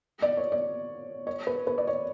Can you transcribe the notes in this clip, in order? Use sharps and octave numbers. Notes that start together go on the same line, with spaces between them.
D5
C#5
D5
C#5
B4
B4
D5
C#5